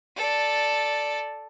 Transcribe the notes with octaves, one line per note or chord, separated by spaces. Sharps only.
A4 D5